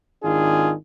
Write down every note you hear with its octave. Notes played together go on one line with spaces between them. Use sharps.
G#1 D#3 D4 F4 G#4